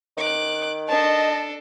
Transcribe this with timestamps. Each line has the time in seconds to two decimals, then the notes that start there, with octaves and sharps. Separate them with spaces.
0.17 D#3 D6 F#6
0.88 D4 A4 D#5 A5